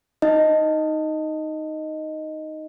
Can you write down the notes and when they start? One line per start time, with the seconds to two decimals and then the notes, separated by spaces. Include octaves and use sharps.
0.22 D#4 D#5